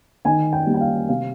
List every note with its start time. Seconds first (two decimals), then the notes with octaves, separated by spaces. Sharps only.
0.25 D#3 G#5
0.53 G5
0.67 G3 A#3
0.74 G5
0.81 F5
1.09 C3 F5